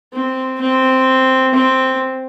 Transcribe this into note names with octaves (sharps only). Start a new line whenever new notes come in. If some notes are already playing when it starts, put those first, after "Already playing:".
C4
C4
C4